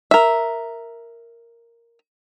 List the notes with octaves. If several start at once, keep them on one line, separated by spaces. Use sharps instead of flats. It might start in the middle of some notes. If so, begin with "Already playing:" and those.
A#4 E5